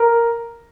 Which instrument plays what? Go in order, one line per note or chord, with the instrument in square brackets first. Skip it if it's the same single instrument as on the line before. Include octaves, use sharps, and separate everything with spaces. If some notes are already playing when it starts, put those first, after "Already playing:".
Already playing: [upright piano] A#4